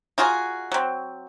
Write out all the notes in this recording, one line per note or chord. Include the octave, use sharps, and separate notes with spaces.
D#4 F4 F#4 G#4
F#3 C4